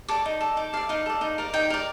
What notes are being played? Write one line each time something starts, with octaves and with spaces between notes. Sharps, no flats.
A4 D5 D6
D#4
A4 D5
D#4 D6
A4 D5 F5
D#4 F5
A4 D5
D#4
A#4 D5
D#4 G5
A#4 D5